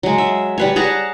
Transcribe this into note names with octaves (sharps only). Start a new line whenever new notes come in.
F#3 G#3
E5
G3 B4 C#5
G#4 F#5 A5 A#5